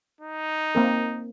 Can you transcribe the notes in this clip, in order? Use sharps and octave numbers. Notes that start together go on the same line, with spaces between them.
D#4
A#3 C4 A#4